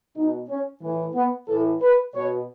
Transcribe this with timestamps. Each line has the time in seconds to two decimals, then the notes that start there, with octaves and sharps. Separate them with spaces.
0.16 B2 D#4
0.49 C#4
0.82 A2 E3
1.15 B3
1.48 A2 E3 A4
1.82 B4
2.14 B2 C#5